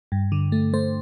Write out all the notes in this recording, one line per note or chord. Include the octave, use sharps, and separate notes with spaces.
G2
D3
A3
A3 C5